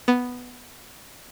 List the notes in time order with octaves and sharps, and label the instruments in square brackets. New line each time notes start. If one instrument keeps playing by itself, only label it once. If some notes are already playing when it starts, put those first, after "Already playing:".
[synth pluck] B3